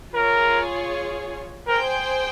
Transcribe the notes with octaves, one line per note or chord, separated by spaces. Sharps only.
F4 G#4 A#4 C#5
G#4 A#4 C5 G5